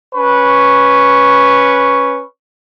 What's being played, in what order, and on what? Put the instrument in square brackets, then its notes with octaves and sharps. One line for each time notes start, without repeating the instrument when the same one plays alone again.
[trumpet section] C#4 B4 C#6